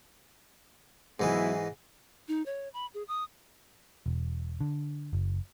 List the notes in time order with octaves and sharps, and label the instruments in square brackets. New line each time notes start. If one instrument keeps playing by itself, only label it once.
[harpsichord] G#2 E3 G#3 [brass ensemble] F#3 B3 E4
[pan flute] D#4
C#5
B5
G#4
D#6
[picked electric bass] E1
D3
F#1